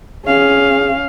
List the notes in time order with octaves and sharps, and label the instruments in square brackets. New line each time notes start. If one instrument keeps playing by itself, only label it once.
[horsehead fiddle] C#4 F5 [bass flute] G#4